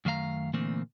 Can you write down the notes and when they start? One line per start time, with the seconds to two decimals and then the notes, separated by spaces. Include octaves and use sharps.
0.05 F#2 D#3 A3 F5 A#5
0.53 A#2 D3 E3 A3 A#3 C4